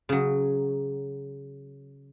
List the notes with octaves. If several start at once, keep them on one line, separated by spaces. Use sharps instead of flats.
C#3 F#3